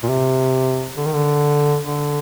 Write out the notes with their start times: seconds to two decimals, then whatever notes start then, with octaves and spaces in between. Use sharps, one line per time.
0.03 A#2
0.09 C3
0.97 D3
1.05 D#3
1.14 D3
1.85 D3